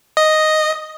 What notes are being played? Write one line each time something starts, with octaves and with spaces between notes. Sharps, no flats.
D#5